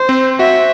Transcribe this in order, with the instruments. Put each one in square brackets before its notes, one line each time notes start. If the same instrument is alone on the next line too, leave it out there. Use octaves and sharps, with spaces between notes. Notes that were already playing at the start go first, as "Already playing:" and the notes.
Already playing: [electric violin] C5
[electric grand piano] C4
[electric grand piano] F#4 [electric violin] E5